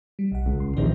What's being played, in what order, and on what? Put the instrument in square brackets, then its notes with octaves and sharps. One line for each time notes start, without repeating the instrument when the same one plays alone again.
[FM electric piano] G3
B1 F#5
[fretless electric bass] C#2
[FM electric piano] C6
[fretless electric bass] A#1 E2 C3 [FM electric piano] D#3 A#3 D#4